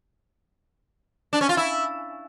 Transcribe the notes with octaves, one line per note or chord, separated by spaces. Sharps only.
D4
C#4
F4
E4